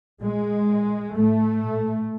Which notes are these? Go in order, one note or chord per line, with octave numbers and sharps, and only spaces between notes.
A#2 G#3
A#2
A2 A3
A#2